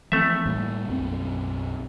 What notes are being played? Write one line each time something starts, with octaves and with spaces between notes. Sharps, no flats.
E3 F3 A3 C4 E5
A2 G3 A#3
B1 F#2 C4